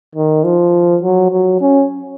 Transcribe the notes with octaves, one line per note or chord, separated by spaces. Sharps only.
D#3
F3
F#3
F#3
C#4